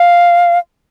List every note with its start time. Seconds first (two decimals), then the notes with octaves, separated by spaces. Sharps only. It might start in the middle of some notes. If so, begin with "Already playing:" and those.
Already playing: F5